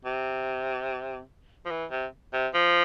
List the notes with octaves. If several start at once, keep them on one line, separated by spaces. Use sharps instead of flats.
C3
F3
E3
C3
C3
F3